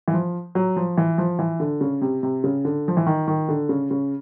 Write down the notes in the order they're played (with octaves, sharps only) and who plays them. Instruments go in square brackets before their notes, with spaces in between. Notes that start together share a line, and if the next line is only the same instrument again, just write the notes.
[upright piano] E3
F3
F#3
F3
E3
F3
E3
D3
C#3
C3
C3
C#3
D3
F3
E3
D#3
D#3
D3
C#3
C#3